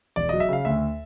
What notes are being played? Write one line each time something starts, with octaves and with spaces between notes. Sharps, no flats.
E1 D5
F#3 D#5
E5
C#3 F5
D2 E5